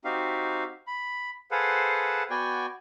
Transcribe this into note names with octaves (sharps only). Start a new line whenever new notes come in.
C4 D#4 F#4 G4 F5
B5
G#4 A4 B4 C5 F5 F#5
B3 F#4 D5 G5 G#5